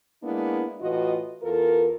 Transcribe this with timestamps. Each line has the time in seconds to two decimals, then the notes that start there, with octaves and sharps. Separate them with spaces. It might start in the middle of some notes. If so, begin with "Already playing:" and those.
0.23 G#3 A#3 B3 D4 E4
0.81 A2 E3 F4 F#4 B4 D#5
1.43 E2 F4 A4 A#4